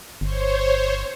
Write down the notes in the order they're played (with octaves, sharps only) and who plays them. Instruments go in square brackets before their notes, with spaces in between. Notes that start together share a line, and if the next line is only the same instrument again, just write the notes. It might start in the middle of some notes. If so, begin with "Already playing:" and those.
[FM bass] G1 [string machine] C5 C#5